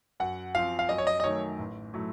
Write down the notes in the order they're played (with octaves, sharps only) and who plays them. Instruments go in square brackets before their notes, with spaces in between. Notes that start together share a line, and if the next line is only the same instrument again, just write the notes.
[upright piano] F#2 [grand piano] F#5
[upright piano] F3 C4 F4 [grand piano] F5
[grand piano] F5
[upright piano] F#2 [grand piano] D#5
[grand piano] C#5
D#5
D#5
[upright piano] D#3 F#3 A3 D#4 [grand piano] C#5
[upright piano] A1
A2 F#3 A3